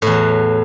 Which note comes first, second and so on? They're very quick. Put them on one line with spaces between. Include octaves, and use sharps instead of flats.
A2 E2 F#3